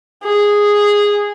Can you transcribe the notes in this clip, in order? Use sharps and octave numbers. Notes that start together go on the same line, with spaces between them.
G#4